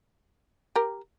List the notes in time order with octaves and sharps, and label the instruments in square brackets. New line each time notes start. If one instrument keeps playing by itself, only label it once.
[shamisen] G4 A#4